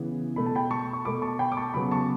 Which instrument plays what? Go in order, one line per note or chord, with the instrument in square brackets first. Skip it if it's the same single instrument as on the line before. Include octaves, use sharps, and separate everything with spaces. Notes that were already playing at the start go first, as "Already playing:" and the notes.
Already playing: [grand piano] C#3 E3 B3
B2 A3 B5
A5
G5 B5
A5 C#6
C#6
B2 A3 B5 D6
A5 C#6
G5 B5
D6
A5 C#6
C#3 F#3 B3 B5 D6
A5 C#6